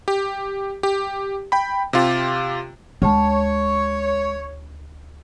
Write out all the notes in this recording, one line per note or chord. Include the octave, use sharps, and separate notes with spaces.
G4
G4
G5 B5
C3 F4 G4
D2 G#3 C#5 A5